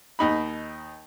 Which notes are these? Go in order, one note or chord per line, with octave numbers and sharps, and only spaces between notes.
D#2 D#4 B5